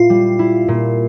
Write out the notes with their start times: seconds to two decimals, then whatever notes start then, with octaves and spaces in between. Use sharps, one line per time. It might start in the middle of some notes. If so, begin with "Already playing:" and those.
Already playing: A#2 E4 F4
0.10 G3
0.39 E4
0.68 A#2